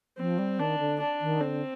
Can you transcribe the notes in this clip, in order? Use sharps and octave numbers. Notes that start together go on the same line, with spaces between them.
F3 C4
G3
D#3 D4
D3
D4
D#3
D3 C4